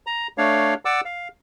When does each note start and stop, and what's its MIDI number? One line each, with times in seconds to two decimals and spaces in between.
0.07 0.27 82
0.38 0.74 57
0.38 0.74 62
0.38 0.74 73
0.38 0.74 77
0.85 1.01 74
0.85 1.01 78
0.85 1.01 86
0.85 1.01 88
1.05 1.28 77